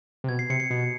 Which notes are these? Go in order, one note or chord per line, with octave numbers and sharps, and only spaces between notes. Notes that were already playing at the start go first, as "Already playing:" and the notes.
C3
B2 G#6
C7
C3 C#7
C#7
B2 C7